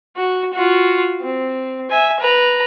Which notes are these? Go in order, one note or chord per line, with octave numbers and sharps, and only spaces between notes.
F#4
F4 F#4
C4
E5 G#5
B4 A#5